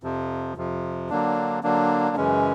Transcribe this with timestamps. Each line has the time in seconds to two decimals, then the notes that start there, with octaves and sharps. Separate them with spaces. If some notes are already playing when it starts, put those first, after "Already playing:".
0.03 F2 C3 F3
0.57 F2 C3 F3
1.09 D3 F#3 A#3 D4
1.63 D3 F#3 A#3 D4
2.16 F#2 C#3 E3 G#3 C#4